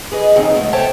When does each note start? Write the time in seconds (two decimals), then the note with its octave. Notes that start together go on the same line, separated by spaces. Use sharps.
0.12 G#4 B4 D#5
0.36 D#2 D#3 C4 D#4 G#4 F#5
0.56 F3 G#3 A3
0.73 A4 C5 C#5 E5 G5 A5